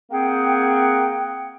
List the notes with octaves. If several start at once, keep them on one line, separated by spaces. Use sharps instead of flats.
A#3 C4 G#4 F#5 G5